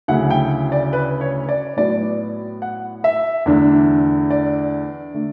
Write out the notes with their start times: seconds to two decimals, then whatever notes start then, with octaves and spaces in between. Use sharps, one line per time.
0.08 D2 C#3 F#3 C#4 E4 F#5
0.30 G5
0.72 D5
0.93 B4
1.21 C#5
1.49 D5
1.77 A2 F#3 B3 D5
2.62 F#5
3.04 E5
3.46 E2 D3 A3 D4
4.30 D5
5.14 D3 A3